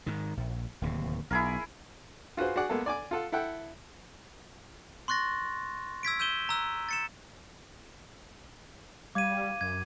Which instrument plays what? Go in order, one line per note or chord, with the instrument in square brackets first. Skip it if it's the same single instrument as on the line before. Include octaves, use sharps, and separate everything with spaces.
[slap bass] G#2 D#3
A#1
D1 D#2 C3
[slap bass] B1 [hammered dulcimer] E4 G#4 A#4
[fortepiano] F4 F#4 G#4 B4 C5
F#4 G#4 D5 F#5
G#3 A#3 B3 G#4 A4
D5 G#5 D6
F4 A4 F#5
E4 A4 F#5 G5
[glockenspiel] C6 C#6 F#6 A6 A#6
E6 G#6 B6 D7
E6 G6 D#7 E7 G7
A#5 E6 F#6
A6 C#7 E7
[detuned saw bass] G3 [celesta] F5 G#6 [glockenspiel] D6 D#7
[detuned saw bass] F#2 [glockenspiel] G#6